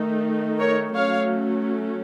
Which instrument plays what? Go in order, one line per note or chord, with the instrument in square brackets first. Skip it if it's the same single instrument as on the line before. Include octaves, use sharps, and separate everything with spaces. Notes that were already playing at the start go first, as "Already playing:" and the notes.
Already playing: [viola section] D#3 A3 D#4
A#4 C#5
F#3 A3 C#4 C#5 F5